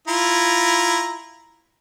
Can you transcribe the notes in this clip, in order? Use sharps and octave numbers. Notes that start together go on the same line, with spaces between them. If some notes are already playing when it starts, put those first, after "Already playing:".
E4 F4 A#5